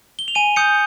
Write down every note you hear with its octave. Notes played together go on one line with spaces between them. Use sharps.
G7
F7
G#5 D#7
D#6 G6 C#7